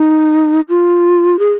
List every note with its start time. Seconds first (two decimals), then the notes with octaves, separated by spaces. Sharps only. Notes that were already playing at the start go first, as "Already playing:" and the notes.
Already playing: D#4
0.69 F4
1.39 G#4